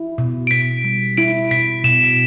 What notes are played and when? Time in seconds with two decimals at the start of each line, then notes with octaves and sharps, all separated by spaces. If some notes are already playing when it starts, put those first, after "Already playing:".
Already playing: E4
0.18 B2
0.47 D7
0.51 B2 B6
0.84 G3
1.17 E4 D7
1.51 B2 B6
1.84 B2 E7